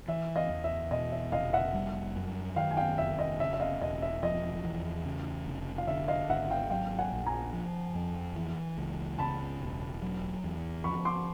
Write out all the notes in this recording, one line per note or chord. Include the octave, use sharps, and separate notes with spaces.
E3 E5
D#5 F5
E2
E5
B2 D#5
E5
F1 D#5 F5
E5 F#5
G3
F#2
D#3 F5 G5
G#5
F5 G5
F1 E5
D#5
C#3 E5
E5
D#5 F5
E1 D#5
E5
F3 D#5
E2
C#3
F1
F5
D3 E5
D#5 F5
G#1 E5 F#5
F5 G5
F#3 F5 G5
F#5 G#5
A#1
G#5 A#5
F3
F2
E3
C#2
C#3 A5 B5
E1
F#3
E2
F3 B5 C#6
C6 D6